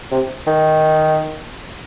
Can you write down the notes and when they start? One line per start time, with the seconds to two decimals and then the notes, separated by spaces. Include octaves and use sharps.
0.11 C3
0.47 D#3